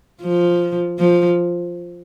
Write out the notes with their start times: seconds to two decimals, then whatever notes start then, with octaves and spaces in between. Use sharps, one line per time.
0.22 F3
0.99 F3